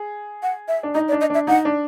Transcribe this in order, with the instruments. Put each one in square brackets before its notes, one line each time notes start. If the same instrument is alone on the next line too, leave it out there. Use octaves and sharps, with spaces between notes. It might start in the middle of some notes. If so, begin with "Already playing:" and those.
Already playing: [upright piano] G#4
[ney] F#5
E5
[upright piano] D4
[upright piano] D#4 [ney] D#5
[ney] D5
[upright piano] D4
[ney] D#5
[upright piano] D4 [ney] E5
[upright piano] D#4 [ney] F#5
[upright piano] D4